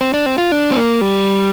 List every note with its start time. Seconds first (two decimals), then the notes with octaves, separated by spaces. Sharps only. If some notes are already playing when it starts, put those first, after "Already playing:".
0.01 C4
0.14 D4
0.26 C4
0.38 F4
0.52 D4
0.71 C4
0.77 A#3
1.01 G3